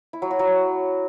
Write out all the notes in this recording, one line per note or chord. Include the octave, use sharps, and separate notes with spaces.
E4
F#3
F#4
F#3